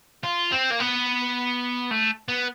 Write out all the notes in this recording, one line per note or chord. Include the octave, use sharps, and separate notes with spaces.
F4
C4
A#3
B3
A3
B3